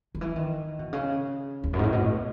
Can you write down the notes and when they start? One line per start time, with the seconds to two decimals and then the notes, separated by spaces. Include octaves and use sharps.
0.15 D#3
0.21 E3
0.36 D#3
0.79 B2
0.93 C#3
1.63 E2
1.73 F#2
1.79 G#2
1.83 A2
1.93 B2
2.02 A2